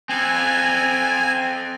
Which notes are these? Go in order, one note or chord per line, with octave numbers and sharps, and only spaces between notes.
C4 A4 G#5